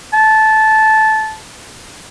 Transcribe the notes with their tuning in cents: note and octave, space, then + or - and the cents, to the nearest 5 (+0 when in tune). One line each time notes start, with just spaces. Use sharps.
A5 -15